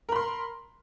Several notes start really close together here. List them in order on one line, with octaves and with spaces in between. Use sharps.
A#4 B5 C6